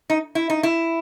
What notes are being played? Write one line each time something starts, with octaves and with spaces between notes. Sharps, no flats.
D#4
E4
D#4
E4